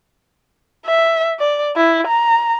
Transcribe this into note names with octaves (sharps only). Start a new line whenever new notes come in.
E5
D5
E4
A#5